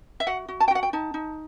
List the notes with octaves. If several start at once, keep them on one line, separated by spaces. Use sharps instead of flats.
E5
F#4 F#5
F#4
A5
G5
F#4 F#5
G5
D#4 A5
D#4